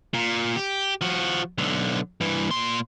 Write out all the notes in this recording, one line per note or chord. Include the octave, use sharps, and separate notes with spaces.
A#2
G4
F3 F#4
B1 D3
G2 E3
A#2 C6